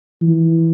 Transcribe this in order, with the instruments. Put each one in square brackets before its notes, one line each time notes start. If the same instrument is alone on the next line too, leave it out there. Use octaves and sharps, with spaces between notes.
[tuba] E3